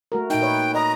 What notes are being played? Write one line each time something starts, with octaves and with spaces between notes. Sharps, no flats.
A3 F#4 A#4
A#2 D#4 G5
B4 C#5
D#5 A#5